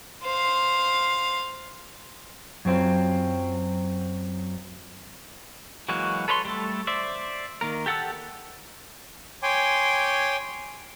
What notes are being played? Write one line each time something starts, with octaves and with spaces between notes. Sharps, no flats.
C5 F5
F#2 F#3 C4 F4
E3 F#3 G#3 A#3 F#4
A4 B4 C#5 E5 C6
G3 A3 A4
C5 D5 E5
D#3 A#3 A#4
G4 A4 F#5 A5 E6
C#5 G5 G#5 C6 D6